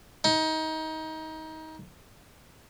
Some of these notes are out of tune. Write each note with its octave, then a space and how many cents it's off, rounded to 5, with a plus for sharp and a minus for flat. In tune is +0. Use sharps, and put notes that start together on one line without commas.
D#4 +25